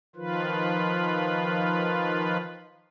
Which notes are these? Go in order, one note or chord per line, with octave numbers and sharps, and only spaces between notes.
D#3 F3 F4 B4